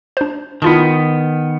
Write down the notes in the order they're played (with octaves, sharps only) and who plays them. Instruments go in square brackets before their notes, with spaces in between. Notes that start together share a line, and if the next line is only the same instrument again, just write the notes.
[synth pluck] D4 C5
[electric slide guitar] D#3 B3 [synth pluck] E4 F4 A5